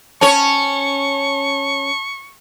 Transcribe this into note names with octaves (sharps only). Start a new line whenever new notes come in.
C#4 C#5 A5 C#6